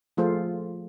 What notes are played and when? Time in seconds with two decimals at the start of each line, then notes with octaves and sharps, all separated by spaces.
0.17 F3 A3 F4 G#4 A4 C5